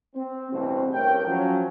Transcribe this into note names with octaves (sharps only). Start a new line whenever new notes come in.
C4
A1 E2 G2 B2 C4
A1 G2 A3 A#4 C#5 G5
F3 F#3 C#4